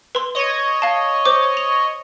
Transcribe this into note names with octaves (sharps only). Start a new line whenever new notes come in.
B4 C6
C#5 D#5
F5 A5
C5 D6
F7